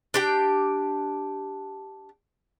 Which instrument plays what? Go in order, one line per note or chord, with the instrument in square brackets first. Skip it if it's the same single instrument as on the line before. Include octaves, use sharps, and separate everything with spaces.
[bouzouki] D4 G4 G5